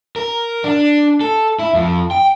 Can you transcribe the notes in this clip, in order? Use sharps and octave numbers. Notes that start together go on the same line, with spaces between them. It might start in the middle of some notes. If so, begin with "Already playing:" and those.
A#4
D4
A4
E4
F2
G5